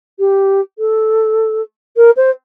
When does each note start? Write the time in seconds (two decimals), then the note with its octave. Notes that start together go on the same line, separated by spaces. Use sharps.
0.19 G4
0.78 A4
1.96 A#4
2.16 C5